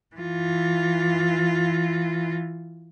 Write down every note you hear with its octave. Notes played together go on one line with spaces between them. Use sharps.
E3 F4